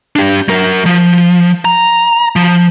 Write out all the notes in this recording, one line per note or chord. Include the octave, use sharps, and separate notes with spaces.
D4 G4
F#3 A#4
F3
A#5
F3